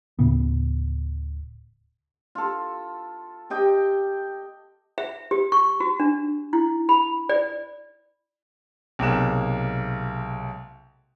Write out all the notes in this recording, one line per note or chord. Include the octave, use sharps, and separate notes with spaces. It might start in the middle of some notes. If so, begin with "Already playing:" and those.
D1 A2 C#3 B3
F4 A4
G4 D#5 G5
E5
G4
C#6
F#4
D4
E4
B5
D5
B1 C3 G#3 A#3 F#6 E7